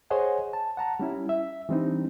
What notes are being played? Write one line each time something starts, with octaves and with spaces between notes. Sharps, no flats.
G#4 C5 C#5 D#5 F#5 G#5
A5
F#5 A5 A#5
G3 C#4 E4
E5
E3 G3 C4 D4 D#4